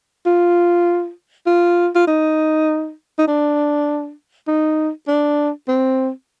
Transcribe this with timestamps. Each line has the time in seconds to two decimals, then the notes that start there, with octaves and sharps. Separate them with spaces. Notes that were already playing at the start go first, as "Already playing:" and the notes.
0.26 F4
1.47 F4
1.96 F4
2.07 D#4
3.19 D#4
3.28 D4
4.48 D#4
5.08 D4
5.68 C4